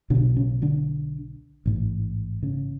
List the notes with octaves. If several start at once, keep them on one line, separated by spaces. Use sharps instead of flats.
B1 B2 D3 D4
C#3 C#4
D3 D4
A1 G#2
C#3 C#4